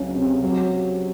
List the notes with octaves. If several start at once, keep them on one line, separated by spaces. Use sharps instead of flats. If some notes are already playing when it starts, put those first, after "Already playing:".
Already playing: C#2 F#3 C#4
C3
F#3